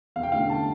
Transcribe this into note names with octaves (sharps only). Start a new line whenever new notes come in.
E2 F5
G5
D3 A3 C#4 F5
A5